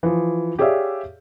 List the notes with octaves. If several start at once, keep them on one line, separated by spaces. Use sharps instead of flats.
E3 F3
G4 G#4 C#5 D5 E5 F5